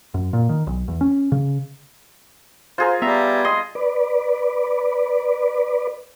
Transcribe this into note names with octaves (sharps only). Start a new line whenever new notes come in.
F#2
A#2
D#3
B1
E2
C#4
C#3
F4 G#4 A#4 C5
G3 B3 E5 A#5
D#5 C6
B4 D5